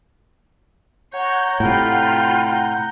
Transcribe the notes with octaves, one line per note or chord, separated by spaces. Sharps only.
C#5 F#5 A#5 G6
A2 C3 F4 G5 B5